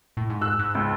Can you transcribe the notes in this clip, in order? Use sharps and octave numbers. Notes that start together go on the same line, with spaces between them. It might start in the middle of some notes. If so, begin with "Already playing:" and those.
A2
G#2
E6 F#6
G#2
C#2